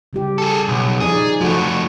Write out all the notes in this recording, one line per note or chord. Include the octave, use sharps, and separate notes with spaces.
C#3 G3 G4
G#4 A4
B1
F3 D#4 G#4 D5
F3 A3 F#4 A4 F#5